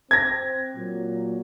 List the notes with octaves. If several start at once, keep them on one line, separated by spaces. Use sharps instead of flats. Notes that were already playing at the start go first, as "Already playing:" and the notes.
C4 G#6 A#6
A#2 F#3